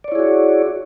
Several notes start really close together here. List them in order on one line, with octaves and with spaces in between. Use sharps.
D5 C#5 E4 G#4 F#4